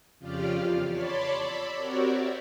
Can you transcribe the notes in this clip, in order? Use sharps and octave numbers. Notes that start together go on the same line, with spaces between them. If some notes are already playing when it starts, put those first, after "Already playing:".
F2 C#3 F4 G4 D5 F6
E2
C#5 D5 A5 B5 C6 D6
D5 B5 E6
C4 F#4 G4 A#4 C#5 D5
E5